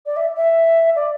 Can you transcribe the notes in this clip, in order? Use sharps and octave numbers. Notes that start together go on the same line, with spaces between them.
D5
E5
E5
D5